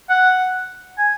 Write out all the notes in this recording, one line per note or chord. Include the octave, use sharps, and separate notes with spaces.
F#5
G#5